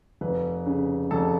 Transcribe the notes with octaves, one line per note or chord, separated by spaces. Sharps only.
F1 B4
C#3
F1 A4